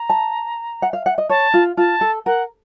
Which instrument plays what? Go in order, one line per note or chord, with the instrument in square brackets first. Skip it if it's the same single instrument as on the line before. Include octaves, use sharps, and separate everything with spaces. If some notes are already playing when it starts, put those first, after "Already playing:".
Already playing: [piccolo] A#5
[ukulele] A5
F#5
F5
F#5
D#5
[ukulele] C#5 [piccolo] A5
[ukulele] F4
[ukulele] F4 [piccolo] A5
[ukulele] A4
[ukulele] A#4 [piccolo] F#5